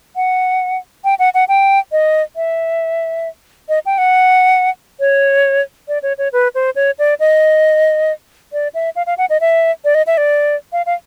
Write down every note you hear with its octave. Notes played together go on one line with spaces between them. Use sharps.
F#5
G5
F#5
F#5
G5
D#5
E5
D#5
G5
F#5
C#5
D5
C#5
C#5
B4
C5
C#5
D5
D#5
D5
E5
F5
F5
F#5
D#5
E5
D5
D#5
E5
D5
F5
F5